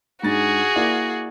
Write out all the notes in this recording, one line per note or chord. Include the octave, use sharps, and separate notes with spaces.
G#2 D4 F#4 G#4 A6
A#3 E4 D5